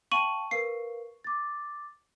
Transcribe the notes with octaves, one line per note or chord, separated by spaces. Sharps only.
F5 G5 A5 C#6 D#7 F#7
A#4 B4 F5 C7
D6 A6